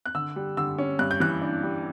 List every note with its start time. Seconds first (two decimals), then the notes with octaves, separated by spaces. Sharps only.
0.06 F#6
0.15 D3 E6
0.36 G3
0.57 D3 E6
0.78 C#4
0.99 G2 F#6
1.11 G6
1.20 E3 F#6
1.42 D4
1.63 G3